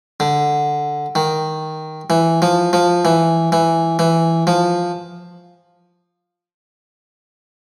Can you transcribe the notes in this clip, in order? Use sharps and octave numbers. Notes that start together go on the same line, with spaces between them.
D3
D#3
E3
F3
F3
E3
E3
E3
F3